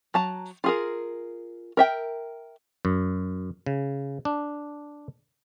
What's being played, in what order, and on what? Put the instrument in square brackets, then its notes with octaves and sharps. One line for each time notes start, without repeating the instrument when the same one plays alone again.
[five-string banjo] F#3 A5 A#5
F4 G#4 A#4
A#4 E5 G5
[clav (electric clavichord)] F#2
C#3
D4